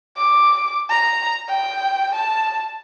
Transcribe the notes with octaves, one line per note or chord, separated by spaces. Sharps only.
D6
A#5
G5
A5